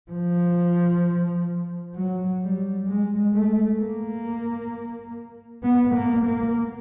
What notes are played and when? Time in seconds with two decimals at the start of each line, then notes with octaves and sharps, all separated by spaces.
0.11 F3
1.95 F#3
2.41 G3
2.87 G#3
3.33 A3
3.79 A#3
5.63 B3
5.94 A#3
6.25 A#3